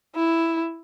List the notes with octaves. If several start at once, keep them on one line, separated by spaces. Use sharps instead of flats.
E4